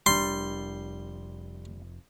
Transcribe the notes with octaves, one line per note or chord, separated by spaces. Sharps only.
F1 G3 D4 C6